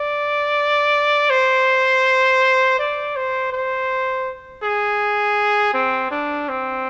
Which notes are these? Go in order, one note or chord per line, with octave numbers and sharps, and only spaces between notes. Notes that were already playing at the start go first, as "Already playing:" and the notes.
Already playing: D5
C5
D5
C5
C5
G#4
C4
D4
C4